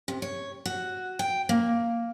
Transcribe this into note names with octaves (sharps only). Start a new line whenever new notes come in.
C3
C#5
F#4
G5
A#3